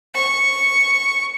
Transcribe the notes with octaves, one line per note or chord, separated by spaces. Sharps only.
C#6